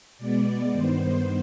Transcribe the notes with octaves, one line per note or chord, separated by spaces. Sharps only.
B2 G#3 B3 D5
G2 D#3 B3 C5